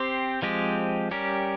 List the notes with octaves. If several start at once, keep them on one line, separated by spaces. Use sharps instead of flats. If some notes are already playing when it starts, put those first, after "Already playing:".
Already playing: C4 G4 C5
F3 G#3 C4 G4
G3 C#4 G4 A#4